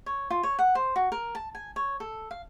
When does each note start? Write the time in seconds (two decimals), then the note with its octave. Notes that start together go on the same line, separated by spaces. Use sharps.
0.06 C#5
0.30 F4
0.43 C#5
0.59 F#5
0.75 C5
0.96 F#4
1.12 A#4
1.35 A5
1.55 G#5
1.76 C#5
2.00 A4
2.31 F5